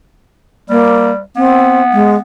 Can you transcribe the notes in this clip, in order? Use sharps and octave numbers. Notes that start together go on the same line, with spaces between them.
G3 A#3
B3 C4
G#3